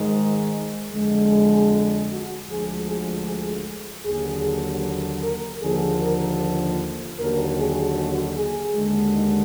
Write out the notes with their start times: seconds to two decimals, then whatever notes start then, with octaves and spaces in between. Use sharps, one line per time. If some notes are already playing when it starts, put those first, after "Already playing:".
Already playing: G#2 D#3 G#3
0.91 F2 D3 G#3
1.31 G#4
2.10 F#4
2.49 D2 D3 F3 G#3 G#4
2.87 G#4
3.27 G#4
4.05 D#2 D3 F#3 G#4
5.23 A#4
5.62 D#2 D3 F3 G#4
6.01 A#4
7.18 D#2 D3 F#3 A#4
7.59 G#4
7.97 F#4
8.36 G#4
8.75 D#2 D3 G#3
9.14 D#4